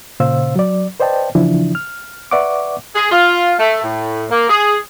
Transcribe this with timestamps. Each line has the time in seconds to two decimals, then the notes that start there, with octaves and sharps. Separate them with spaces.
0.20 A#2 C#3 C5 F5 E6
0.56 F#3 D5
1.00 B4 C5 D5 D#5 G5 A5
1.35 C#3 E3 F3 D4 E4
1.75 F6
2.31 B4 D5 E5 F#5 C#6 D6
2.95 G#4
3.11 F4
3.59 A3
3.83 A2
4.31 A#3
4.49 G#4